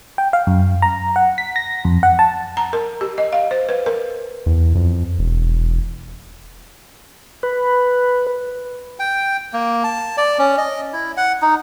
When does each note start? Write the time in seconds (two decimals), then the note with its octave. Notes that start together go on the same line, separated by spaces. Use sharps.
0.18 G5
0.33 F5
0.47 F#2
0.82 A#5
1.16 F#5
1.38 B6
1.56 A#6
1.85 F2
2.03 F#5
2.19 A5
2.57 A#5
2.73 A#4
3.01 G4
3.18 D#5
3.33 F5
3.51 C5
3.69 B4
3.86 A#4
4.46 E2
4.75 F2
5.19 E1
7.43 B4
8.99 G5
9.53 A#3
9.84 A5
10.18 D5
10.39 C#4
10.58 D#5
10.93 E4
11.17 F#5
11.42 D#4